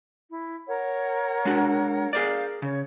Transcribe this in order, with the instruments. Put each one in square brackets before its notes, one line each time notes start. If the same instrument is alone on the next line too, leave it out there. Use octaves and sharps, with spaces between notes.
[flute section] E4
A#4 C#5 F#5
[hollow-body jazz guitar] G#3 D4 F#4
[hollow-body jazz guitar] G#4 A#4 D5 [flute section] F5 F6 G6
[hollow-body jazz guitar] C#3 [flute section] C#5